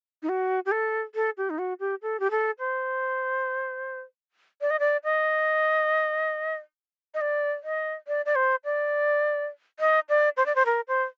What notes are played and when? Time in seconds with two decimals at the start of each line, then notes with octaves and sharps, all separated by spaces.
0.23 D#4
0.29 F#4
0.66 G4
0.71 A4
1.15 A4
1.37 G4
1.50 D#4
1.58 F#4
1.80 G4
2.02 A4
2.20 G4
2.31 A4
2.59 C5
4.61 D5
4.70 D#5
4.80 D5
5.04 D#5
7.14 D#5
7.21 D5
7.63 D#5
8.07 D5
8.25 D5
8.35 C5
8.64 D5
9.80 D#5
10.09 D5
10.37 C5
10.46 D5
10.55 C5
10.66 A#4
10.88 C5